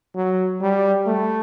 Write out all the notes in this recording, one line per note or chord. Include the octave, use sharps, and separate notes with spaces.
F#3
G3
A3